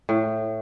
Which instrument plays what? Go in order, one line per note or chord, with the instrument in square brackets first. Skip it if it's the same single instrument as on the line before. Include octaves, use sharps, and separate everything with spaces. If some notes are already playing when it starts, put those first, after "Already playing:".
[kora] A2